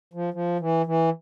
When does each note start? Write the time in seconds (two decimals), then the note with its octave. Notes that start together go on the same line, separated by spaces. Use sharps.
0.13 F3
0.34 F3
0.60 E3
0.86 E3